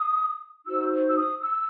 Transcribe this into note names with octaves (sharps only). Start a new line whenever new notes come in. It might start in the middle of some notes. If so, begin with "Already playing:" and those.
Already playing: D#6
D#4 F#4 C5 E6
E6
D#6
E6